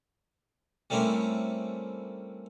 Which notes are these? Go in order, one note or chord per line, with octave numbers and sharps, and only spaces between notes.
G3 A3 A#3 C4 C#4 E4